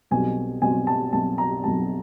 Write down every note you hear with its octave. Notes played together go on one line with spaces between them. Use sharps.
B1 B2 G3 C4 G#5
B1 B2 G3 C4 G#5
A5
B1 B2 G3 C4 A5
A#5
B1 B2 G3 C4 A5